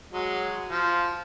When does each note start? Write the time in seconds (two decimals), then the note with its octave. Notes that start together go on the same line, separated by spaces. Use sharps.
0.12 F#3 G#3
0.69 F3